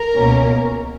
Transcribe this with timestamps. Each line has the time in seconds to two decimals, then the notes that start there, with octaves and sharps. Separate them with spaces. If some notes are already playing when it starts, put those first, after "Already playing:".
Already playing: A#4
0.15 C#2 B2 A#3 C#4